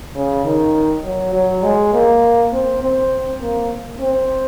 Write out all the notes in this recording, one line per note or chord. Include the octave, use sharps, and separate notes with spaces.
C#3
D#3
F#3
F#3
G#3
A#3
C4
C4
A#3
C4